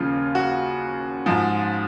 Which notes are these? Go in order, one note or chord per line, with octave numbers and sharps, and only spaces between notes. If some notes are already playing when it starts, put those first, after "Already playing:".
Already playing: D#2 C#3 F3 F4
F#4
G#2 F3